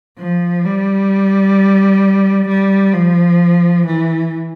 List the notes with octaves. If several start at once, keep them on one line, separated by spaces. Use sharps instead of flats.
F3
G3
G3
F3
E3